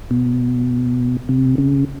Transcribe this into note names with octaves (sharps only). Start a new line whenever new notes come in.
B2
C3
C#3